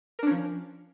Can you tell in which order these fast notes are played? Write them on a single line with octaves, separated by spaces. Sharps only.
A#4 D4 C#4 F3